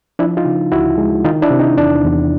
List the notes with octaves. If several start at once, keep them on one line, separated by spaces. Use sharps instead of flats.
F3 D4 E4
D#4 F4
C#3
D2 E4 F#4
G#3
D#3 D#4 F4
D4 E4
C3
D#4
E2 D4
E2